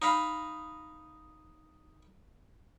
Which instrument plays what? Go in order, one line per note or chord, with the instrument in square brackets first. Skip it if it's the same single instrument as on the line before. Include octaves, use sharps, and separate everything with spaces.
[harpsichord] D#4 F5 B5